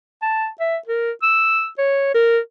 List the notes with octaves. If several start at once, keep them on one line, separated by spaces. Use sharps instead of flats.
A5
E5
A#4
E6
C#5
A#4